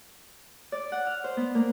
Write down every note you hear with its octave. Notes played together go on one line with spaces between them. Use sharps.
D5
F#5
F6
C5
B3
A#3